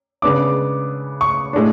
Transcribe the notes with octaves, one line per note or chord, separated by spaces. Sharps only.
C#3 G#3 B3 D4 D6
C#6
A2 G#3 D4